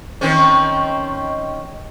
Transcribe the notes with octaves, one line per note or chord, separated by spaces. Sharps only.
D#3 C4 C#4